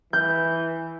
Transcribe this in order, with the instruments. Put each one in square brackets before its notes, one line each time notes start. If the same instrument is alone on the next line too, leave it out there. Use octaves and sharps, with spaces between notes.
[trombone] E3 [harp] G6